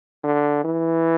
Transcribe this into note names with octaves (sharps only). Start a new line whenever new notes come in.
D3
E3